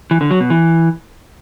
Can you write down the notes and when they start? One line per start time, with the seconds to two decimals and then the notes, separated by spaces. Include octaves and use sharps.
0.11 E3
0.21 D3
0.31 F#3
0.40 B2
0.50 E3